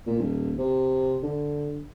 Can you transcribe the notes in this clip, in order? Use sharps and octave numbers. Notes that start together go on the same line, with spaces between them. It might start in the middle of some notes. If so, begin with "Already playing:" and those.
A#2
D#1
C3
D3